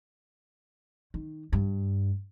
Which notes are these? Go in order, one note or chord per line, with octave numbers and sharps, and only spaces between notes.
D#3
G2